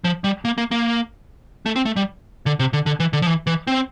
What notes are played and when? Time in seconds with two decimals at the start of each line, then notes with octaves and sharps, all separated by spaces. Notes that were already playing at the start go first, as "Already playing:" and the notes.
0.04 F3
0.24 G3
0.45 A#3
0.58 A#3
0.71 A#3
1.66 A3
1.76 C4
1.85 A3
1.96 G3
2.46 D3
2.59 C3
2.73 D3
2.86 D3
3.00 E3
3.13 D3
3.22 F3
3.27 E3
3.47 E3
3.67 C4